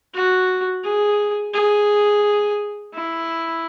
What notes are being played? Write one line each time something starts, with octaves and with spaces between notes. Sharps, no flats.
F#4
G#4
G#4
E4